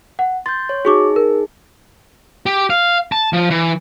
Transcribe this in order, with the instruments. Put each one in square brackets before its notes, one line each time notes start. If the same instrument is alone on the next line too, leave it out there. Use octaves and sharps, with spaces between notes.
[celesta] F#5
[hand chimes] C6 G6 [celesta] A6
[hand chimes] C#5
[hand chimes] D#4 G#4 [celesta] F#4 C#6 D6
[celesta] A#4
[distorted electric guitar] G4
F5
A5
F3
E3